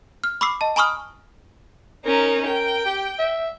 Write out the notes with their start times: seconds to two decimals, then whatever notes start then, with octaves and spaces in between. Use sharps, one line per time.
0.24 F6
0.41 B5 C#6 D6 E6 C7
0.61 D#5 A5
0.76 G#5 A#5 B5 C#6 D#6 F6
2.05 C#4 D#4 A#4
2.47 A#4 G5
2.85 G4
3.19 E5